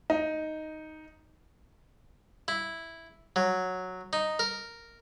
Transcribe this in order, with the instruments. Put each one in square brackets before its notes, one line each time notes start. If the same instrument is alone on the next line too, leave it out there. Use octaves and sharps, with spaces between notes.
[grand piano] D#4
[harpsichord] E4
F#3
D#4
A#4